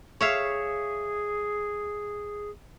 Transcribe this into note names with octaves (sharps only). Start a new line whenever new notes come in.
G#4 C#5 E5 F5